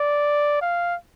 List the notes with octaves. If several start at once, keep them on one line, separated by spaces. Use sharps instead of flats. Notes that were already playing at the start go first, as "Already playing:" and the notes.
Already playing: D5
F5